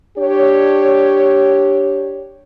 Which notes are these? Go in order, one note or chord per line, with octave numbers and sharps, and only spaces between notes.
D4 G4 C#5